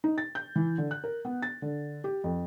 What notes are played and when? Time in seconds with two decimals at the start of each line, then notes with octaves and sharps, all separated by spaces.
0.04 D#4
0.18 A6
0.35 G6
0.56 E3
0.78 D3
0.91 F#6
1.04 A#4
1.25 B3
1.42 A6
1.62 D3
2.04 G4
2.24 F2